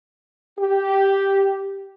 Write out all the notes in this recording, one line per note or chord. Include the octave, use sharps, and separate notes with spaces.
G4